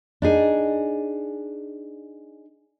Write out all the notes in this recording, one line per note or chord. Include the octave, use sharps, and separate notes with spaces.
D4 D#4 G#4